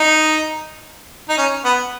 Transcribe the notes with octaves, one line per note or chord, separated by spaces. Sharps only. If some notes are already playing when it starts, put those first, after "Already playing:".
Already playing: D#4
D#4
C#4
B3